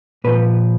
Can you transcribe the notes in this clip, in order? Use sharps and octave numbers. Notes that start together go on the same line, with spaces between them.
A#2 F3 B4